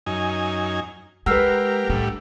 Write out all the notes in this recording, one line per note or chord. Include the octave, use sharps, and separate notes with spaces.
F#2 D#4 G#5
G#3 G4 A#4 B4 F#5 E6 F6 C7
A2 G3 D4